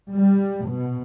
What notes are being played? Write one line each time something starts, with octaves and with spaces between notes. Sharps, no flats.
G3
B2